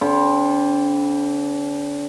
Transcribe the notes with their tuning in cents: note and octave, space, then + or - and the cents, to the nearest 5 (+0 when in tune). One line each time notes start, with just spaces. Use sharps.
D3 -35 C4 +10 B5 -10